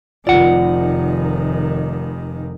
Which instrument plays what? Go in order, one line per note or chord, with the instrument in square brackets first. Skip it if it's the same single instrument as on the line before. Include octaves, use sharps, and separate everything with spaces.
[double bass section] F1 D#3 [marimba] F4 [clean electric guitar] D5 F#5